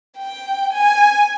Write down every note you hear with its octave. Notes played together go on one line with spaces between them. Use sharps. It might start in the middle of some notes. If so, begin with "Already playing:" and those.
G5
G#5